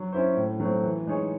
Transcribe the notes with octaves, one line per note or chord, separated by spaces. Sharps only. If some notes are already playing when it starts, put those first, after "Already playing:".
Already playing: F#3
C#4 E4 C5
A2
F#3 A3 C4
E3
G#3 D#4 G#4 C#5